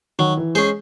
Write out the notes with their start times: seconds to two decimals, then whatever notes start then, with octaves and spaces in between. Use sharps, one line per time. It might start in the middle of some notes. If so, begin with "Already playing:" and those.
0.19 D#3 F#3
0.37 E3
0.55 G#3 C#4 G#4 C5